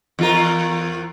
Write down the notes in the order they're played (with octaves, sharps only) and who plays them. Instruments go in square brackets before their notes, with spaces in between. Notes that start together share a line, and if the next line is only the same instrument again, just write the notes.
[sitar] E2 F4 A#4